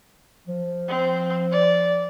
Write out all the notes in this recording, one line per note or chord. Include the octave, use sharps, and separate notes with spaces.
F3
C4
D5